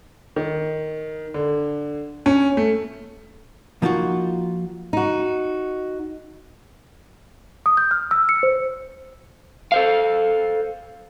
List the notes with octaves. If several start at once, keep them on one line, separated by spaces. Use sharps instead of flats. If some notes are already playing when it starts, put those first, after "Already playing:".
D#3
D3
C#4
A3
F3 A#3 D#4 F4 F#4
D#4 F#4
D#6
G6
F6
E6
C#7
C5
A4 C5 F5